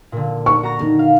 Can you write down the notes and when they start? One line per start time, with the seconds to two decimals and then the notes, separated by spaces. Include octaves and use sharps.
0.12 A#2 D3
0.46 C#6
0.63 F#4 A#5 A#6
0.80 D#3 D#4
0.99 F5